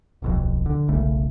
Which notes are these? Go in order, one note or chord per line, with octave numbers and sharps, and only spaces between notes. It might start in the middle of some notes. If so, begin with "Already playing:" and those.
D1 B1 F2
D3
E1 B1 C#3 A3